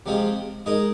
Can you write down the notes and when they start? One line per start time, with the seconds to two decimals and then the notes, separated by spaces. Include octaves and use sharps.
0.06 C3 F3 G#3 C4 F4
0.66 G#3 D#4 A#4 D#5